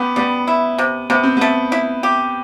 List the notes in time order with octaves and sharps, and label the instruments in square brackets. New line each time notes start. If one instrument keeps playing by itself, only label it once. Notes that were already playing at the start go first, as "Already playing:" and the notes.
Already playing: [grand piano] B3 [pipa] G4
[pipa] G3 [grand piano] B3
[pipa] E4
C3
[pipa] C3 [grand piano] B3
[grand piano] C4
[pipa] A3 [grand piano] B3
[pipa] E4
G4